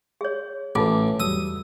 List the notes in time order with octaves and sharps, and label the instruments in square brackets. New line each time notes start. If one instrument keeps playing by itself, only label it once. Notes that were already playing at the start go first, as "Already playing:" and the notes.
[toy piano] G#4 C#5
[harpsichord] A1 [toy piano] F4 [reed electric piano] B4 A5 D6
[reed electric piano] E2 F#3 G3 [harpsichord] D#6 [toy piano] E6